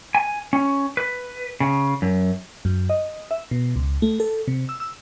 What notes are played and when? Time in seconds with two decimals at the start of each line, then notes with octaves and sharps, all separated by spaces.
0.15 G#5
0.53 C#4
0.97 B4
1.60 C#3
2.02 F#2
2.65 F#2
2.89 D#5
3.31 E5
3.51 B2
3.76 C#2
4.02 A3
4.20 A4
4.48 C3
4.69 E6
4.80 E6